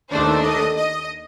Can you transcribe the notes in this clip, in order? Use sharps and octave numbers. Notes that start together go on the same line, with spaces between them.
D#2 D#3 A3 D4 C5
D#5
D#5